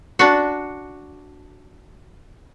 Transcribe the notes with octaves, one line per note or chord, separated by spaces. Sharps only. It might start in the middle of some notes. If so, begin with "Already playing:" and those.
D4 F#4